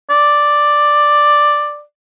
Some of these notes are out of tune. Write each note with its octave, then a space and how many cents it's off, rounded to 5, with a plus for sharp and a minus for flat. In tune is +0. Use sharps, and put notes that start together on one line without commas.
D5 +5